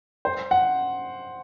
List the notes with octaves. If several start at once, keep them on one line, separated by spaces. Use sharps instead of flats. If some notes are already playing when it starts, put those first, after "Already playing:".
C5
F#5